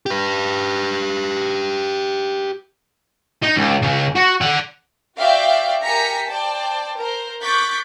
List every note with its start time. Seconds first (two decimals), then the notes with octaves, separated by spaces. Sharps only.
0.06 G4 B4
3.43 D#4
3.56 C#2
3.82 C#3 G#3
4.16 F#4
4.41 D5 F#5
5.18 F#4 C5 D5 E5 F5 G5
5.83 G4 A#4 G#5 A#5 B6 C#7
6.27 C5 D5 G5 A5
6.95 A#4 C5
7.41 C#6 D6 F#6 G6 A6 B6